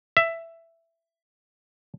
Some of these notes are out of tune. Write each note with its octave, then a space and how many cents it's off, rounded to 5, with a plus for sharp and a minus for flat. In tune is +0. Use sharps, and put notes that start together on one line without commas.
E5 +10